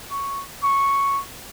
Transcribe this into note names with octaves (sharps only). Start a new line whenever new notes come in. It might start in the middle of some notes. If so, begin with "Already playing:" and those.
C#6
C#6